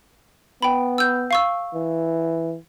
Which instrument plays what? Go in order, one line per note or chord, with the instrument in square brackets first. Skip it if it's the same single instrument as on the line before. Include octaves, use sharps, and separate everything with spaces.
[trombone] B3 [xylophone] G5 B5
[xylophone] E6 G6
F5 C#6 E6
[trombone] E3